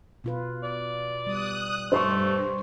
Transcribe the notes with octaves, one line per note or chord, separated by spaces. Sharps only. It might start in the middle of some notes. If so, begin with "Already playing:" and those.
B2 F4 B4
D5
G3 D#6 F#6
G2 A3 C5 C6 C#6